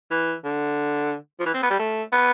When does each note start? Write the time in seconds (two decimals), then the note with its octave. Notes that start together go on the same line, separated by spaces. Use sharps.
0.11 E3
0.45 D3
1.40 F3
1.46 E3
1.54 C4
1.63 B3
1.70 G3
1.79 A3
2.13 B3